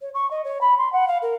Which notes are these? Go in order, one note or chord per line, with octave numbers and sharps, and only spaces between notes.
C#5
C#6
D#5
C#5
B5
C6
F#5
F5
A#4